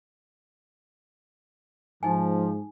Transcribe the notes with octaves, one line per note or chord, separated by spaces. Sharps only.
G#2 F3 D#4 G#5